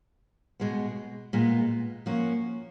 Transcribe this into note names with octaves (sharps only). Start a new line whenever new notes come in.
B2 G#3 B3
A#2 G#3 B3
F3 A#3 C#4 F#4